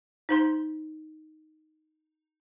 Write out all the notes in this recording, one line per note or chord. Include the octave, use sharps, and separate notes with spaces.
D#4 C5 C6